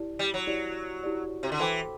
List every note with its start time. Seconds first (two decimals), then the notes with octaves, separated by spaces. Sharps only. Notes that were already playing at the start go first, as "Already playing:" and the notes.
Already playing: E4 G4 D5
0.19 G3
0.34 F#3
0.47 E4 G4 D5
1.04 E4 G4 D5
1.43 C3
1.52 D3
1.60 E3 A4 C5 G5 B5 D6